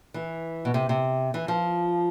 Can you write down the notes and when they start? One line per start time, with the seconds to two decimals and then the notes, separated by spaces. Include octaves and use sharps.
0.14 E3
0.65 B2
0.74 C3
0.89 C3
1.34 E3
1.48 F3